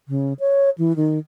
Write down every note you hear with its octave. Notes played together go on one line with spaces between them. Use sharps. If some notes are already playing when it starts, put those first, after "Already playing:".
C#3
C#5
E3
D#3